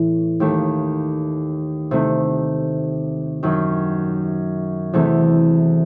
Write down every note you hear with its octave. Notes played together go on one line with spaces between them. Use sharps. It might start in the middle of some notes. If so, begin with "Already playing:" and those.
Already playing: A2 E3
D#2 D#3 A3
C3 D#3 A3
F#2 D#3 F#3
E2 C3 E3 A3